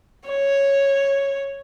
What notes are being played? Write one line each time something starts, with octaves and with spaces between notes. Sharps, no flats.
C#5